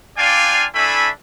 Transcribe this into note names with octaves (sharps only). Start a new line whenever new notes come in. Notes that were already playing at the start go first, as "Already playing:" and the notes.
D4 F4 D5 F5 G5 G#5
A3 D4 E4 E5 G#5 B5